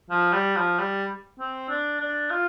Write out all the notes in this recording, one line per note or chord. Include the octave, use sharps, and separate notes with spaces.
F3
G3
F3
G3
C4
D4
D4
F4